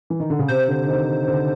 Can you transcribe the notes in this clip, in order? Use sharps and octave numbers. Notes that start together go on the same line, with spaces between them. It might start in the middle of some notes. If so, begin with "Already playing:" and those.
E3
D#3
D3
C#3
C3 C5
D3
D#3
D3